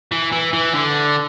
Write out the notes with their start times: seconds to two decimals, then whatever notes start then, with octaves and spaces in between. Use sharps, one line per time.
0.12 E3
0.32 E3
0.53 E3
0.74 D3